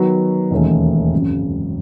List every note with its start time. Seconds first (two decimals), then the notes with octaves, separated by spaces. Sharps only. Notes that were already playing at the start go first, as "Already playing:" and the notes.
Already playing: D#3 F#3 B3 F#4
0.51 E1 D#2 D#3 A3 C#4
1.13 G#1 F#2 C#3